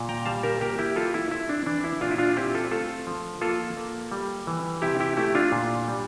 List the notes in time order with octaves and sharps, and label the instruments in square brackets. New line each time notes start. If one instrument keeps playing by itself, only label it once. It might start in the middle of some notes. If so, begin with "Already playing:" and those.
Already playing: [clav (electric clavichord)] A#2
G5 A#5
G3 F5 A5
G4 A#4
A#3 G4 A#4
E4 G4
G3 F4 A4
E4
C4 E4
D4
E3 D4
E4
A#2 D4 F4
E4
D4 F4
C4 E4 G4
F4 A4
A3 F4 A4
F3
A#3 F4 A4
A#3
G3
E3
C3 E4 G4
E4 G4
A3 E4 G4
D4 F4
A#2
G3